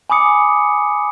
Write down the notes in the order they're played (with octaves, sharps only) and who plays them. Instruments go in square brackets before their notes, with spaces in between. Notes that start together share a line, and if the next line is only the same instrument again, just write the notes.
[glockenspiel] G#5 B5 D6 D#6 C#7